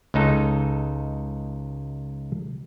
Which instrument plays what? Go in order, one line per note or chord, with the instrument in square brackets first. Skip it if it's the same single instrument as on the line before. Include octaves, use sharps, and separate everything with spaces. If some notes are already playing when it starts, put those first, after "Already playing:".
[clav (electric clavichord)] C#2 G#3 D#4 A4